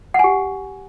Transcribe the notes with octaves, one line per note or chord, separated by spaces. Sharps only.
G4 F#5 G#5